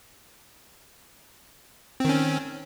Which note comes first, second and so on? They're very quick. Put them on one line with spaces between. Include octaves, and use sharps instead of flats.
C4 D#3 C#4